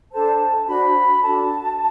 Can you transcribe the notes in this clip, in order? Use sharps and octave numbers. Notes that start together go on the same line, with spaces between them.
D4 A4 C5 A5
D4 F#4 C5 B5
D4 F#4 A4 A5